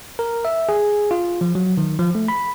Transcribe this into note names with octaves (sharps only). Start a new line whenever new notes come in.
A#4
E5
G#4
F4
F3
F#3
D#3
F3
A3
B5